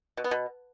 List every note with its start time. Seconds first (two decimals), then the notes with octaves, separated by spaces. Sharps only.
0.17 B2
0.24 B3
0.31 B2